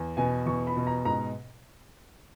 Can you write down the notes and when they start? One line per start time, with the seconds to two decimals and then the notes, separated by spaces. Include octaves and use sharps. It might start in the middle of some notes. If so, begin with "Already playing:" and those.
Already playing: E2
0.17 B2 G#5
0.46 E2 C#6
0.67 B5
0.77 B2
0.87 A#5
1.05 G#2 A#5